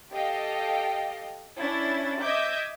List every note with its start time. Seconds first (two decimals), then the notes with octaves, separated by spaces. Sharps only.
0.11 G4 A4 D#5 F5 G5
1.59 C#4 D4 E4 A6
2.22 D#5 E5 D6 G6 G#6